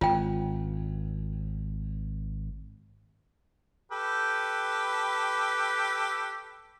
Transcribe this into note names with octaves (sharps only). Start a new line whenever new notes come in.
G#1 F4 G5
G4 A4 B4